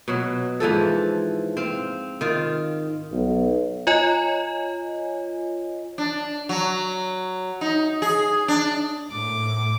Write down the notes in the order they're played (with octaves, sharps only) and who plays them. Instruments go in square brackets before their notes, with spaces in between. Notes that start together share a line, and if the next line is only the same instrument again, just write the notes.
[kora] B2 F#3
G#2 E3 F3 A4
C4 F5
D#3 F4
[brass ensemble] B1
[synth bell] F4 C#5 D#5 G#5
[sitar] D4
F#3
D#4
G#4
D4
[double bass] A2 [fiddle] D6